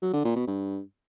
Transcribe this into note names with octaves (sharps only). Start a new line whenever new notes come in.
F#3
D3
A#2
B2
G2